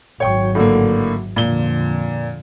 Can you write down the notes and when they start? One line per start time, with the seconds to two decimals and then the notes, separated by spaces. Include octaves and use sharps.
0.20 G#1 F#3 C#5 G5 C#6
0.55 A2 D3 A#3
1.36 F2 A#2 D3 G7